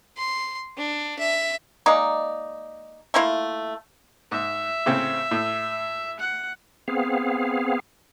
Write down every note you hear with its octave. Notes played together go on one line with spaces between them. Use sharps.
C6
D4
E5
G#3 A#3 D#4 D5
A3 A#3 E4 F4
G#2 E5
A2 C#3 C4
A2
F#5
B3 C4 G#4 F5